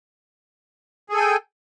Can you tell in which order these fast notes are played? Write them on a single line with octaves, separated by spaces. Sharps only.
G#4 A4 G#5 G5